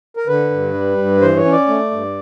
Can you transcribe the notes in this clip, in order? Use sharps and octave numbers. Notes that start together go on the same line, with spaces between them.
A#4
D3 B4
G2
G3
G2
E3 C5
C#5
C#4
D5
A3
G2